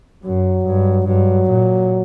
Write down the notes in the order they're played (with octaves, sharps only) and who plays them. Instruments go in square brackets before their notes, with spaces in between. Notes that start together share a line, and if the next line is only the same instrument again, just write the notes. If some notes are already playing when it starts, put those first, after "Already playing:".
[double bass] F#2 [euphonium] F#3
[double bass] G2
[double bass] G2 [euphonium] F#3
[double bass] A#2